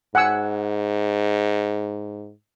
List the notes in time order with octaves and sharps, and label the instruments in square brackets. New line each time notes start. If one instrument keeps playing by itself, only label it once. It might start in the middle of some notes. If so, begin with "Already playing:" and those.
[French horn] G#2 [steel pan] F#5 G#5 E6